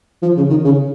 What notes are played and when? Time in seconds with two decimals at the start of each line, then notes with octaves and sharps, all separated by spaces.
0.22 F3
0.37 C#3
0.50 D#3
0.64 C#3